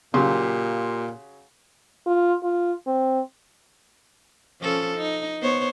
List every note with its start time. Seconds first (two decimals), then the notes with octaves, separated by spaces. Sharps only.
0.14 A#2 C#3 F#3 G4 C6
2.06 F4
2.43 F4
2.87 C4
4.61 F3 C#4 A4
4.97 D#4
5.41 B3 C5 C#5